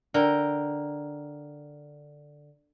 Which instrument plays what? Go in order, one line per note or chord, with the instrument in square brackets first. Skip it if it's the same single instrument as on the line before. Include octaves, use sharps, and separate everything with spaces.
[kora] D3 A#4 G5